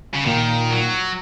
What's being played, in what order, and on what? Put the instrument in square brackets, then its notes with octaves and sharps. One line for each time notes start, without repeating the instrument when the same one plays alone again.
[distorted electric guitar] C#3
[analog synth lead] A#2 [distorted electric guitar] D#3
[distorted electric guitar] F#3